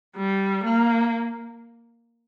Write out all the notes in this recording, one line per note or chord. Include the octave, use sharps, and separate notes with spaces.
G3
A#3